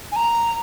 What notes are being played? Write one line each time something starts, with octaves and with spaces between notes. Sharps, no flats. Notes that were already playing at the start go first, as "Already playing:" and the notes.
G#5
A#5